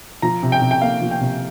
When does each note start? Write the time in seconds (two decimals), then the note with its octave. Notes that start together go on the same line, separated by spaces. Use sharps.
0.22 F3 A#5
0.43 C3
0.52 G5
0.62 C3
0.71 G5
0.82 A#3 F5
1.02 F3
1.11 G5
1.21 C3